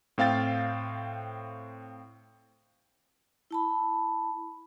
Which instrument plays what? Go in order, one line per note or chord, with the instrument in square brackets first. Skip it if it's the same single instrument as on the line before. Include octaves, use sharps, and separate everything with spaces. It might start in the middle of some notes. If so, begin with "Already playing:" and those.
[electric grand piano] A2 C4 F5 G5 A6
[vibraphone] E4 A5 B5